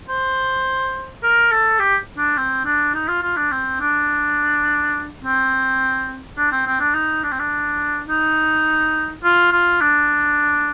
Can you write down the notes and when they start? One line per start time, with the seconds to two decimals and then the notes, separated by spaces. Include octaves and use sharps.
0.08 C5
1.23 A#4
1.52 A4
1.79 G4
2.18 D4
2.37 C4
2.65 D4
2.94 D#4
3.08 F4
3.23 F4
3.37 D4
3.51 C4
3.80 D4
5.23 C4
6.38 D4
6.52 C4
6.67 C4
6.80 D4
6.94 D#4
7.24 D4
7.31 C4
7.39 D4
8.09 D#4
9.24 F4
9.52 F4
9.81 D4